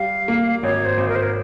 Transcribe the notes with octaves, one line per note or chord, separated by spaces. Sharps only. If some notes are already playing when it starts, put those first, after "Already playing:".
Already playing: G3 F5
A#3
G#1 C#5
C5
G#1
A#4
C5
A#4